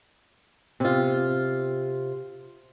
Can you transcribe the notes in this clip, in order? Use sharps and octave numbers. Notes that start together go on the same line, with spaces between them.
C3 F4